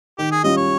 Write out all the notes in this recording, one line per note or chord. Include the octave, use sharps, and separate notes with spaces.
D#3 G4
G#4
G3 C#4 F4 D#5
C#5